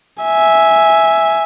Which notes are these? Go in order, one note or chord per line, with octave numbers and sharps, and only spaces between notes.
E5 G#5